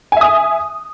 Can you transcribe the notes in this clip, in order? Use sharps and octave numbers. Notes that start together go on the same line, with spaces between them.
E5 G#5 D#6